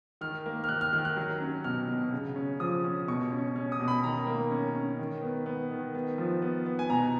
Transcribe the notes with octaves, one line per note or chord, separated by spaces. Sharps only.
D#3 F6
A#3
F6
D#3 F#6
F6
D#3 F6
F#6
F#3
C#4
B2 F6
B2
C#3
C#4
F3 D#6
C#4
B2 C#6
C#4
C#4
D#6
B2
B5
D#3 A#5
A#3
C#4
C#4
D#3
B3
B3
D#3
B3
F3
B3
B3
G#5
B2 A#5